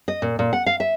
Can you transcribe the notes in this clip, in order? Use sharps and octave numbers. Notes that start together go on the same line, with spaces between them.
D#5
A#2
A#2
F#5
F5
E5